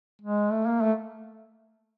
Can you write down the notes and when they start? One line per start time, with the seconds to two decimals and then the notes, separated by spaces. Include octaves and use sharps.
0.22 G#3
0.52 A3
0.66 A#3
0.81 A3